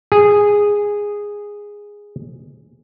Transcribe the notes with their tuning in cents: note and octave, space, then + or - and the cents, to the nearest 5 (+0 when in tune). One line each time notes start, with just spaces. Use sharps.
G#4 -10